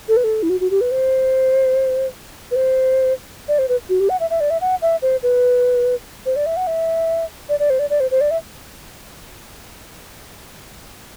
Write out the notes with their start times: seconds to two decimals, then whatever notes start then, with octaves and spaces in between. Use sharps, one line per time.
0.08 A4
0.17 B4
0.24 A4
0.43 E4
0.50 F#4
0.60 F#4
0.71 G4
0.81 B4
0.91 C5
2.51 B4
2.56 C5
3.48 D5
3.59 C5
3.69 B4
3.89 F#4
4.00 G4
4.09 F#5
4.20 E5
4.30 E5
4.40 D5
4.50 E5
4.61 F#5
4.82 E5
5.02 C5
5.23 B4
6.26 C5
6.36 D5
6.46 E5
6.57 F#5
6.67 E5
7.49 D5
7.59 D5
7.70 C5
7.79 D5
7.90 D5
8.00 C5
8.11 C5
8.21 D5
8.31 E5